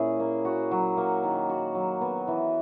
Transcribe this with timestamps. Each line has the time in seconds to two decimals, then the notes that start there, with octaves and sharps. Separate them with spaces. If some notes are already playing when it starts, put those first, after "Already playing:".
Already playing: A#2 C#4 E4 G#4
0.20 A#3
0.45 F#4
0.71 F#3
0.97 A#3
1.24 D#3
1.49 F#4
1.75 F#3
2.01 B3
2.28 E3